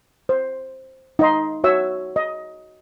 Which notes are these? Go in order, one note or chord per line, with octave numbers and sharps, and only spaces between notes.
C5
D#4 D#5 C6
F#4 C#5 E5 E6
D#5